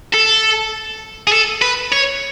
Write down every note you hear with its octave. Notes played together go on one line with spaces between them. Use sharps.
A4
G#4
A4
B4
C#5